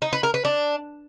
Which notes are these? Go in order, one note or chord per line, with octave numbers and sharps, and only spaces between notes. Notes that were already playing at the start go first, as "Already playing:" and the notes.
D#4
B4
A#4
B4
D4